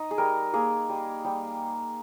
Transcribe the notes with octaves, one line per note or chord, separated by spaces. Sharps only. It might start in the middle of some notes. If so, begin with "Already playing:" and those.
Already playing: D#4 D#5
G#4
G3 A#4
A#3 G#4
G3
G3